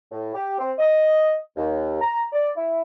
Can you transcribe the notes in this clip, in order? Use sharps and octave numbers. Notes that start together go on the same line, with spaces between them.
A2
G4
C4
D#5
D#2
A#5
D5
E4